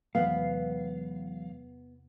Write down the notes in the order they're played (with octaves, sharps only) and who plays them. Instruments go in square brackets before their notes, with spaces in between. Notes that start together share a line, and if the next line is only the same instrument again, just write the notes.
[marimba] E2 C3 D#3 [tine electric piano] E3 F#3 G#3 [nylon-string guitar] B3 [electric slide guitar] F5